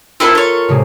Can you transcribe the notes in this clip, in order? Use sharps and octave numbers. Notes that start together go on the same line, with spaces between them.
C4 E4 F4 A4 A#4
A4 C#5
A2 C3 G#3